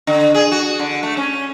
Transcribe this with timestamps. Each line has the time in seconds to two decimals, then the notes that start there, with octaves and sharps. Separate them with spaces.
0.07 D3
0.35 G#4
0.52 F#4
0.79 D3
1.03 A3
1.17 C#4